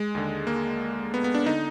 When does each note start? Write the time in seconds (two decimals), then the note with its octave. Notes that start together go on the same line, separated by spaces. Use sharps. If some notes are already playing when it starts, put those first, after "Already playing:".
Already playing: G#3
0.15 D#2 D3
0.47 A#3
1.14 B3
1.24 B3
1.35 D4
1.46 D3 D#4